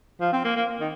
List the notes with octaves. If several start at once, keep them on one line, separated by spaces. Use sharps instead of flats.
F3
C4
A#3
A#3
D#3